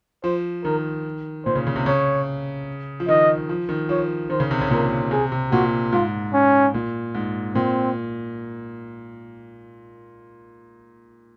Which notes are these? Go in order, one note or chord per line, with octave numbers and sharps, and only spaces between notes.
F3 C5
D#3 A#4
A#2 C5
C#3
C#3
C3
C#3 C#5
F3
D#3 D#5
F3
D#3
F3 C#5
D#3 C5
C#3
C3
C#3
A#2 A#4
C3 G#4
C3
A#2 F#4
G#2 F4
C#4
A#2
G#2
A#2 C4